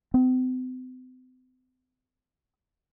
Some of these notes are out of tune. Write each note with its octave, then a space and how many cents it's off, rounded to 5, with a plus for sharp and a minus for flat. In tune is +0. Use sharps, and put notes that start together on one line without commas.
C4 -45